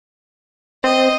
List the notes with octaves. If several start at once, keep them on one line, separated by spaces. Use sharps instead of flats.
C4 C5 D#5